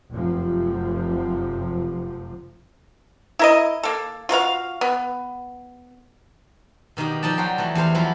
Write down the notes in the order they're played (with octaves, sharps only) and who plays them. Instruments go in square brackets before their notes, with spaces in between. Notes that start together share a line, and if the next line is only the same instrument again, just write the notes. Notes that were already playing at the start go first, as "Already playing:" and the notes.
[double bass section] F1 F#2 C3 F3
[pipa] E4 A#4 D#5
A#3 A4
F4 F#4 B4 F5
B3
[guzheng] B2 D#3 A#3 G4
F3 D#4 D5 G5 A5
F#3 F#4 G5 C6
E3 F3 A3
E2 G4 C5 F5
F3 F#3 E4 F4 G4